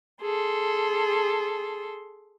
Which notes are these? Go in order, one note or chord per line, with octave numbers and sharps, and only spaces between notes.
G#4 A4 C6